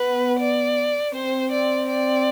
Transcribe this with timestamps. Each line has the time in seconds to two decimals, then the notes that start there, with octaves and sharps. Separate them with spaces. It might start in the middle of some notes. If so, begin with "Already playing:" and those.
Already playing: B3 B4
0.39 D5
1.14 C4 C5
1.52 D5
1.90 D5